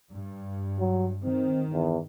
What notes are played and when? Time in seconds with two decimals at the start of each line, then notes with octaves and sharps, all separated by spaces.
0.11 G2
0.80 F#3
1.23 D#3 C4
1.73 E2